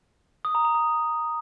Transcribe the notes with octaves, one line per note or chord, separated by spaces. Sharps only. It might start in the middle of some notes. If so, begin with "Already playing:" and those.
D#6
A#5
A#5
D#6